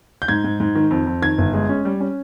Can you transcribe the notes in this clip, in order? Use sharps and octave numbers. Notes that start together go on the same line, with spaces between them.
G6
G#2 G#6
G#2
G#2
D#3
F2
F2
D#3 G#6
G1
G#3
C#4
G3
C#4